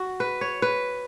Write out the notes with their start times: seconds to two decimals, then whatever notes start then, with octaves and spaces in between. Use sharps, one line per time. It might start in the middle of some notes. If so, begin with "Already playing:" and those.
Already playing: F#4
0.20 B4
0.41 C#5
0.62 B4